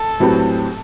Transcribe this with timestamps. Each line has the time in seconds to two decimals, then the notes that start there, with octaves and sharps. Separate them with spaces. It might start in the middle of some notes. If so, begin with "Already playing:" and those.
Already playing: A4
0.20 A2 F#3 C4 G4 B4